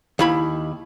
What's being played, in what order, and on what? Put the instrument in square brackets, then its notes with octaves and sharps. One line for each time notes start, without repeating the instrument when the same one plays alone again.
[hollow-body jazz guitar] D#2 E4 B5